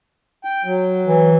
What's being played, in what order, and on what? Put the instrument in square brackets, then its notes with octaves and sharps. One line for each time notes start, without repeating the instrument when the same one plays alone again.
[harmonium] G5
F#3
[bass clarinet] E3